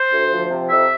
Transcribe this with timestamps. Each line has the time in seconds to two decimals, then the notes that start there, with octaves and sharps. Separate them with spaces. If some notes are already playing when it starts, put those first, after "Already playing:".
Already playing: C5
0.12 D2
0.31 F3
0.50 C3
0.69 F2 E5